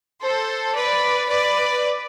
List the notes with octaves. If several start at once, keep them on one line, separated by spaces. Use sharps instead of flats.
A4 C5
B4 D5
B4 D5